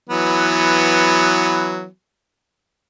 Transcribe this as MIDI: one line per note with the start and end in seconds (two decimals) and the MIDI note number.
0.10 1.86 52
0.10 1.86 54
0.10 1.86 59